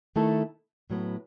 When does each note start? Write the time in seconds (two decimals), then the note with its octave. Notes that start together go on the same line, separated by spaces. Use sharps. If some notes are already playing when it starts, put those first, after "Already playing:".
0.16 D#3 A3 E4 A4
0.90 A2 F#3 B3